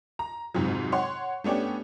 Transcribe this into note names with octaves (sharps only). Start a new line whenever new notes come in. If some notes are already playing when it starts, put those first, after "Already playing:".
A#5
F2 G#2 C3 F#3
C#5 F#5 C6
A3 B3 C#4 D4 G4